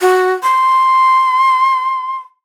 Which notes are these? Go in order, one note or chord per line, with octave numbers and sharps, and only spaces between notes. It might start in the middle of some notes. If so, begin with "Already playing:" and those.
F#4
C6